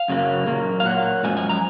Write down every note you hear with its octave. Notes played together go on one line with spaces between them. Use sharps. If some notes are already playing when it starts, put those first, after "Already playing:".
Already playing: F5
F#2 C#3 F#3 A#3
A#2 F#3 A#3
F5
A#2 F#3 A#3 F#5
F#2 F3 G#3 G#5
G#5
A#5